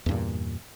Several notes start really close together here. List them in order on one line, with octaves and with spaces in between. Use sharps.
E2 G2 A#2